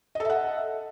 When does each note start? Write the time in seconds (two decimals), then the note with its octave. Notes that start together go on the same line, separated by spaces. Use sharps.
0.15 D#5
0.20 A4
0.25 E5
0.30 F#5